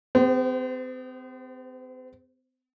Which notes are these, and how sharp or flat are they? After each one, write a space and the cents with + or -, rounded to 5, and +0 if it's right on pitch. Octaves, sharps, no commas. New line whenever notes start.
C4 -40 G#4 -25 C5 +0